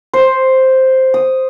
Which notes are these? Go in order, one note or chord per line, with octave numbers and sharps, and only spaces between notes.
C5
D#6